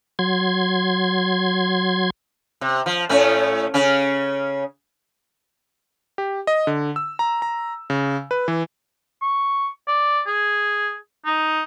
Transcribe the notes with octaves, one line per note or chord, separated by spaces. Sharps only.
F#3 C6 G#6
C3
F3
A2 A3 C#4
C#3 C#4
G4
D#5
D3
E6
A#5
A#5
C#3
B4
E3
C#6
D5
G#4
D#4